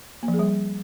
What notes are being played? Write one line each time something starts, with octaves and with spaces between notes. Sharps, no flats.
A#3
F3
G#4
G3